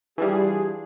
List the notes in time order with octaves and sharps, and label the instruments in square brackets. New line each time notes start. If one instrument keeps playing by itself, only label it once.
[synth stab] E3 G3 [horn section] D4 F4 G#4